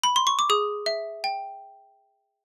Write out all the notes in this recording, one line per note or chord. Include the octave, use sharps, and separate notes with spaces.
B5
C6
C#6
D6
G#4 D#6
E5
G5